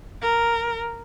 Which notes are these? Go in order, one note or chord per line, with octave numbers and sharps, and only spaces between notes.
A#4